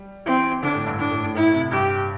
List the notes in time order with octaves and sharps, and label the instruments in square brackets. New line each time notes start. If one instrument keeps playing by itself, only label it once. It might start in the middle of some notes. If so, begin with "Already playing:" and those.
Already playing: [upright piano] G3
[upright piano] E3 [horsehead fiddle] C4
[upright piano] D3 [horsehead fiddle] D4
[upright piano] A2
G2
[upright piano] A2 [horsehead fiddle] D4
[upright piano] A2
A2
[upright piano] A2 [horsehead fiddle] E4
[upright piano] C3
[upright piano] G2 [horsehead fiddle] G4